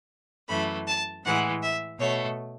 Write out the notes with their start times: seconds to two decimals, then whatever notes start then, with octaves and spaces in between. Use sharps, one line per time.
0.48 F#2 E3 A3 B5
0.87 A5
1.24 A2 E3 G#3 F#5
1.61 E5
1.99 B2 A3 C#5